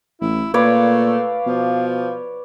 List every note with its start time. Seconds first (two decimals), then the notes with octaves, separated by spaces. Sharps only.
0.21 A1 E4
0.54 A#2 A3 B4 C#5 D5 F5
1.47 B2 F3